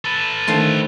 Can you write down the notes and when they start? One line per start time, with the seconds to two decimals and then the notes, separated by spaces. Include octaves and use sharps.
0.05 A4 B4
0.47 D3 D#3 F3 A3 C6